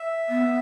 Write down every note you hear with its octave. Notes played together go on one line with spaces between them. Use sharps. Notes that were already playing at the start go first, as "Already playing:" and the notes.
Already playing: E5
B3